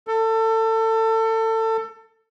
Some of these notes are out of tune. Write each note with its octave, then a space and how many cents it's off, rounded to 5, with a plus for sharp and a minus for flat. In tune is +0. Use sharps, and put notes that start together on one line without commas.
A4 +25